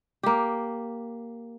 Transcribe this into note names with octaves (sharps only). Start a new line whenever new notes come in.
A#3 G4